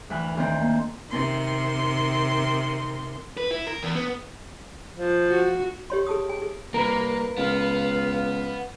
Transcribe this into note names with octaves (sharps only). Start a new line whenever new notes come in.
D2 E3 B4 G#5 F6
D2 D#3 C4
A#3
C3 D#3 C6
B4
E4
A#4
E2
B3
F3
F#4
G4 C#5 C6
G#4 A5 D#6
G#5
G#4
C2 A#3 A#4 B4 A#5
C#2 B3 F5